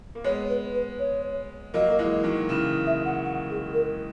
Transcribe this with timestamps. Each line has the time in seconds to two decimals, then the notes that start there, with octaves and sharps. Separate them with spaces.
0.15 A#3
0.24 G#3 B3 C#5
0.50 B4
0.75 B4
0.99 C#5
1.74 F#3 A#3 D#5
1.90 A#3
1.99 E3 G#3
2.24 D#3 F#3
2.49 C#3 E3
2.87 E5
3.05 F#5
3.24 F#5
3.50 G#4
3.74 A#4